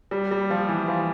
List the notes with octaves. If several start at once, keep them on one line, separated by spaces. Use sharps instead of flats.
G3
G3
F3
E3
F3